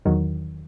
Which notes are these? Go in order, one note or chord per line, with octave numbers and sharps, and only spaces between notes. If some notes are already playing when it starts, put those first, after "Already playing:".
E2 D#3 F#3